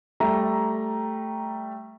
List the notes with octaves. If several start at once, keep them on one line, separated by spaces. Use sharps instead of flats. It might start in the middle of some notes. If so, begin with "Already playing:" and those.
G3 A3 E5 A#5